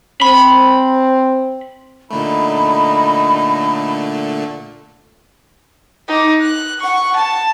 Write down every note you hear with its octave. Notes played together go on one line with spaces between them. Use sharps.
C4 B5
A#2 D3 A3 D#4 B5
D#4 D6
F#6
F#5 C#6
A5